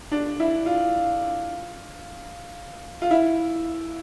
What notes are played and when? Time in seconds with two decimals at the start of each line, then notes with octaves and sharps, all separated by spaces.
0.12 D4
0.40 E4
0.66 F4
3.02 F4
3.11 E4